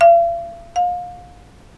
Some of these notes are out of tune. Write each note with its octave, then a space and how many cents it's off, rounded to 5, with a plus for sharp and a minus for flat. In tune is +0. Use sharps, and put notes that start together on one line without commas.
F5 -45
F5 +30